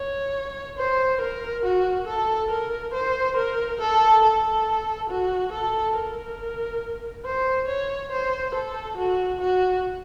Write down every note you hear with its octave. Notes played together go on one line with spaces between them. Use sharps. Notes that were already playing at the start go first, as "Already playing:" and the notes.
Already playing: C#5
C5
A#4
F#4
A4
A#4
C5
A#4
A4
A4
F#4
A4
A#4
C5
C#5
C5
A4
F#4
F#4